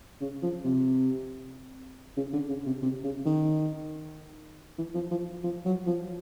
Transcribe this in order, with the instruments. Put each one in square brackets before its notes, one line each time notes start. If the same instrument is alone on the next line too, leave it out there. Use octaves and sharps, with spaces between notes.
[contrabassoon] C#3
F3
C3
C#3
D3
C#3
C3
C3
C#3
D#3
E3
F3
F3
F3
F#3
F3